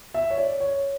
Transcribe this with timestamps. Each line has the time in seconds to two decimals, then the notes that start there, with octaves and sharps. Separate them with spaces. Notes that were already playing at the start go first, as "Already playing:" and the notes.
0.14 E5
0.30 C#5
0.38 D5
0.60 C#5